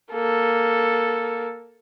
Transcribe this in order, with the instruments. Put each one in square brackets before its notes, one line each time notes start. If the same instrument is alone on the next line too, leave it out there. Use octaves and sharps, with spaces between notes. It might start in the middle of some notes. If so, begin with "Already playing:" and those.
[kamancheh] A#3 A4